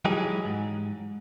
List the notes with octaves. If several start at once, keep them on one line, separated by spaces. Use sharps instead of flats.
E3 F#3 G#3 D#4 G4 G#4
G#2